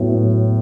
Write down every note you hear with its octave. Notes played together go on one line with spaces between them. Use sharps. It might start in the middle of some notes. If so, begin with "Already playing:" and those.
Already playing: A2 F#3 B3